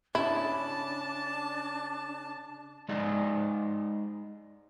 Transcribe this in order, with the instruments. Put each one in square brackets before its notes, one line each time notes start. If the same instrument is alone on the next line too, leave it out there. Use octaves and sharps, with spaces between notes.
[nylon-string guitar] C#3 [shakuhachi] D4 [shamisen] E4 [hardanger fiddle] A5
[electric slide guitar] G#3 D#4 G#4 D5 D#5